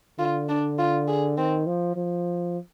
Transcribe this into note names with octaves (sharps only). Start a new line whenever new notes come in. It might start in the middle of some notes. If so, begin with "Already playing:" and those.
D3 F4
D4
F4
G#4
D#3 C4
F3
F3